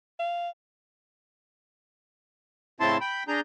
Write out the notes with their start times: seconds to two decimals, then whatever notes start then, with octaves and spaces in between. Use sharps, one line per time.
0.20 F5
2.80 A2 C#3 C4 E4 A5 C6
3.01 G5 B5
3.28 D4 G#4 A#5 G6